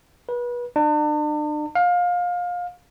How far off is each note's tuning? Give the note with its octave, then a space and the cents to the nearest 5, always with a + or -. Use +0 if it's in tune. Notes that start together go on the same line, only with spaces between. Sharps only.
B4 -30
D4 +40
F5 +25